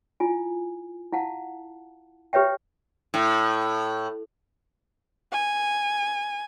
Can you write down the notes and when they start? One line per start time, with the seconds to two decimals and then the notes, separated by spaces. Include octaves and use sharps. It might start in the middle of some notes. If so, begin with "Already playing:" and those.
0.20 E4 F4 G#5
1.12 E4 F5 F#5 A5
2.33 G4 B4 C#5 E5 G5
3.14 A2
5.32 G#5